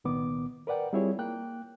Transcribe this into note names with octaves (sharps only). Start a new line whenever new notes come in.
C2 A#2 D#3 B3 D6
A#4 B4 D5 F#5 G5
G3 C4 E4 F4 G#4 C#5
A#3 G5 F#6